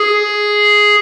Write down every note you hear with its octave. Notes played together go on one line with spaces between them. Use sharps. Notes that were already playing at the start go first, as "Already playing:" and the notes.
Already playing: G#4